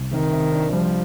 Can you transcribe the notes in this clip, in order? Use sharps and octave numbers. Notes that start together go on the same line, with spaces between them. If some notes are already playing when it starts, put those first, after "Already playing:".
Already playing: C2
C3 D#3
C3
D4
F3 G3